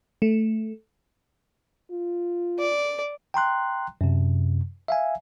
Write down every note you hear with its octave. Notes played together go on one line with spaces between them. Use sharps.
A3
F4
D5
G5 A#5 C6 F#6
F#2 C3
E5 F5 G#5